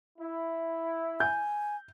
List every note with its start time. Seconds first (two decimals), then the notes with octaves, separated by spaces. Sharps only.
0.19 E4
1.20 G#5 G6